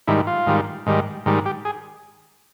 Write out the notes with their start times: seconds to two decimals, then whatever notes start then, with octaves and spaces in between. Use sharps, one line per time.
0.07 G#2 D#3 G3 E4
0.27 F4
0.46 G#2 D#3 G3
0.86 G#2 D#3 G3
1.26 G#2 D#3 G3
1.46 G4
1.65 G#4